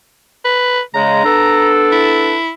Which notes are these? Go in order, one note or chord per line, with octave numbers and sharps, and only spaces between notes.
B4
C#3 G#3 A#5
B3 D4 A4
E4